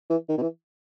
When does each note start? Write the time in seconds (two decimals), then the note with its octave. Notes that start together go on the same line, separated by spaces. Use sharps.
0.10 E3
0.29 D#3
0.38 B2
0.42 E3